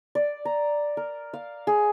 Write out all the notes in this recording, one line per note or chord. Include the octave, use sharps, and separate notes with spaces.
D5
A#5
A#4
F5
G#4